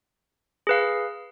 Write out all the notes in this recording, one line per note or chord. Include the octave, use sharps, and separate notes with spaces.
G#4 B4 F5